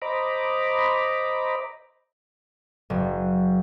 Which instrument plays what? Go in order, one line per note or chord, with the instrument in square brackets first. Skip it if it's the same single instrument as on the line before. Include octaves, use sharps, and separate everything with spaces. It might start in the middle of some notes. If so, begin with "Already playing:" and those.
[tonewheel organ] C5 D#5 A#5 B5 D6
[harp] F#1